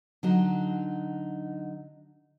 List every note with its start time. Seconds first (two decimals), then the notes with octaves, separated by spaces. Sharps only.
0.23 D3 F#3 D#4